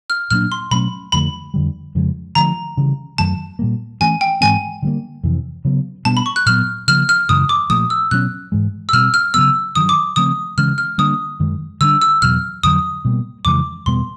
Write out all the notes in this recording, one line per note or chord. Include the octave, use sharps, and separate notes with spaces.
F6
A#2 F#3 A#3 D4 F6
C6
B2 F#3 A3 C#4 B5
F2 D3 F3 A3 B5
F2 D3 G3
F2 C#3 F3 G#3
D3 F3 A3 A#5
C#3 E3 G3
F#2 D#3 F#3 A3 A5
A#2 G3 A#3
G2 E3 A3 C#4 G#5
G5
G#2 E3 G#3 C4 G#5
D3 G3 A#3
F2 C3 E3
C#3 F#3 B3
B2 G3 B3 D4 A5
B5
C#6
F#6
A#2 F#3 B3 F6
C#3 F3 A#3 F6
F6
F#2 C#3 E3 G#3 D#6
D6
A#2 F3 A3 D#6
E6
B2 F#3 A#3 C#4 F#6
G#2 E3 G#3
E6
B2 G3 C4 F6
F6
C#3 F#3 B3 E6
G2 D#3 F#3 D#6
D6
C#3 F3 A3 C4 D#6
C#3 E3 G#3 C#4 F6
F6
D3 G3 A#3 D4 D#6
F#2 D#3 G#3
D3 G3 B3 D4 E6
E6
E2 B2 F#3 F6
F2 D3 F#3 D#6
B2 G3 A#3
F2 C#3 E3 G#3 D6
E2 B2 G3 B3 C6